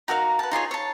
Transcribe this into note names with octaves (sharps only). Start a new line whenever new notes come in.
D#4 F#4 A#4 F5
B4 A5
D#4 F4 G#4 C#5
C#5 A5